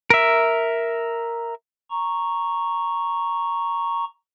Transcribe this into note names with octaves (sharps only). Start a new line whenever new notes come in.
A#4 E5
A#5 C#6